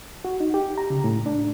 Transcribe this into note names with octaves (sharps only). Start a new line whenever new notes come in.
F#4
D#4
G4
A#5
C#3
A2
D4